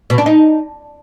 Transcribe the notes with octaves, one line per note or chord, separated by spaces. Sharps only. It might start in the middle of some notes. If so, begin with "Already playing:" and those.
B2
D4
D#4